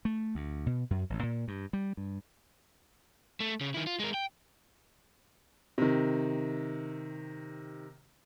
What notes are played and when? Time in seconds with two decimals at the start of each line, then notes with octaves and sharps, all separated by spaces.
0.05 A3
0.35 D2
0.66 B2
0.90 F#2
1.10 A1
1.23 A#2
1.48 G2
1.73 G3
1.97 G2
3.40 A3
3.61 C#3
3.74 D#3 E4
3.87 F4
3.99 G#3 A#4
4.14 G5
5.78 C3 D#3